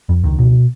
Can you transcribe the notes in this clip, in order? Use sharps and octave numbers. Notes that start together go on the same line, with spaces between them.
F2
C#2 D#3
B2